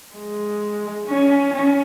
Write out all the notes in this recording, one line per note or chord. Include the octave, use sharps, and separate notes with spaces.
G#3
C#4
C#4